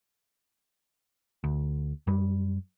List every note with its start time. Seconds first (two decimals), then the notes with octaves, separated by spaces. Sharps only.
1.44 D2
2.07 F#2 G3